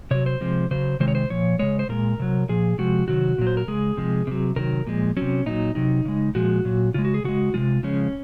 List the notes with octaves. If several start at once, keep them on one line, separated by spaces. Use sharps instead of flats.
C3 F#3 C#5
C5
C3 F3 G#3
C#3 F#3 C5
C3 D#3 G#3 C5
C#5
C5
A#2 F3 C#5
C#3 G#3 C#5
C5
A#2 G#3 A#4
C3 F#3
A#2 F3 G#4
C3 F3 G#3 F#4
C3 D#3 F#3 F#4
A#2 F#3
C5
A#4
C#3 G#3 G#4
C3 F3 G#3
C3 F#3
C3 D#3 F#3 A#4
A#2 F3 G#3
C3 F#3 C#4
A#2 F#3 D#4
C3 F#3 D#4
C#3 G#3
A#2 F3 G#3 F#4
A#2 F#3
C#3 G#3 F4
F#4
G#4
C#3 G#3 F#4
C3 D#3 G#3 F4
C#3 F3 G#3 C#4